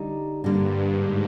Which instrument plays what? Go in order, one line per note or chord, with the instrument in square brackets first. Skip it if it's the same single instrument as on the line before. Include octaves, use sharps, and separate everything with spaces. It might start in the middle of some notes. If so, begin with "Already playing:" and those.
Already playing: [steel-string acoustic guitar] D3 G3 D#4
[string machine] G2 [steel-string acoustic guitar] D3 G3 A#3 D4
[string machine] G#2